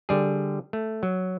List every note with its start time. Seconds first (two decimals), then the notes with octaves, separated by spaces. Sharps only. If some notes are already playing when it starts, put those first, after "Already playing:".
0.09 D3 G3 G#4
0.73 A3
1.03 F#3